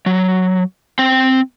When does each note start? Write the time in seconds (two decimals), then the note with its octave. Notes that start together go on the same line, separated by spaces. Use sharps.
0.06 F#3
0.99 C4 G5